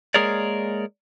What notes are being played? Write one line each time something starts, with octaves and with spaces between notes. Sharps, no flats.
G#3 A#3 G#4 A#4 C#5 D5